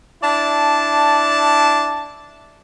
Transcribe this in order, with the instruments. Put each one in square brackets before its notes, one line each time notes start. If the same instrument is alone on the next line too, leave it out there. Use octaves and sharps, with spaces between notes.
[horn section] D4 E4 D5 A5